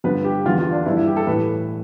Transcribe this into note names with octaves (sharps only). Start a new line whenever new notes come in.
G2 D3 F3 B4
G4
E2 D3 F3 F4
F4
D4
G2 F3 E4
E4
G4
A4
A2 E3 B4